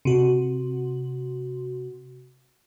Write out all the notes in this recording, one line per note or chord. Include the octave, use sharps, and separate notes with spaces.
C3 F#4